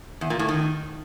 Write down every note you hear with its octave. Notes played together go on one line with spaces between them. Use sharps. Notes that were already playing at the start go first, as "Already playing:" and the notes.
E2
A#2
A2
D#3